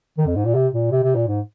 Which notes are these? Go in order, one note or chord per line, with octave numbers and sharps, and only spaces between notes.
D#3
F2
G#2
A#2
C3
A#2
C3
C3
A#2
G#2